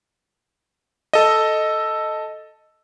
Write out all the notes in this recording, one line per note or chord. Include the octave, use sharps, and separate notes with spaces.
A4 D#5